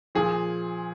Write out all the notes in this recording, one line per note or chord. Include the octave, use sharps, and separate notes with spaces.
A#2 F3 G#4